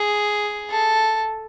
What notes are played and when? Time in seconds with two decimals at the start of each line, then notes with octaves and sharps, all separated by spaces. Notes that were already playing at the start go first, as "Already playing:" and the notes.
Already playing: G#4
0.71 A4